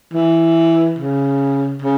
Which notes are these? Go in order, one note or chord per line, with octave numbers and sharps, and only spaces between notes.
E3
C#3
C#3